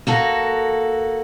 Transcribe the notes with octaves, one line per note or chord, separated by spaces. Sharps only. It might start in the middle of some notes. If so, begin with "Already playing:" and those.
A#3 F#4 A4